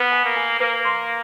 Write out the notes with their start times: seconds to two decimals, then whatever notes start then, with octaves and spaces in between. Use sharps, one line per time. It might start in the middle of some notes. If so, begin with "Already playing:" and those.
Already playing: B3 B4
0.12 G#5
0.25 A#3
0.36 G#5
0.60 A#3 B4
0.85 C6